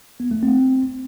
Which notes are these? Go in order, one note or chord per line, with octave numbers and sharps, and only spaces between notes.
B3
A3
C4